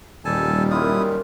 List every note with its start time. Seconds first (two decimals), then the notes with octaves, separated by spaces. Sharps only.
0.25 D#1 D#2 G3 A4 G#5 A5
0.71 F#2 E4 F4 D#6